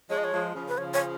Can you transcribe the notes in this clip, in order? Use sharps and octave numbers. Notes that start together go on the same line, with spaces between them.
F3 G#3 C#5
D#5
C#5
F3 G#3
C#3 F3
B4
C#3 F3 C#5
C#5